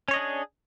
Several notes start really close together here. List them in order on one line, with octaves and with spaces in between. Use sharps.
C#4 C#5 D#5 D4 G#4